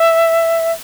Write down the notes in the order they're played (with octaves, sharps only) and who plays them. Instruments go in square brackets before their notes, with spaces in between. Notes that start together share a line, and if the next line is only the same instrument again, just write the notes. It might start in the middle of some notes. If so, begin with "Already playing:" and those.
Already playing: [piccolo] E5